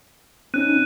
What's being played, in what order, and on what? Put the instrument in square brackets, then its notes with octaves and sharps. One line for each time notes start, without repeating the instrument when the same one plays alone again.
[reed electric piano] C4 C#4 D#4 [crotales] F#6 D#7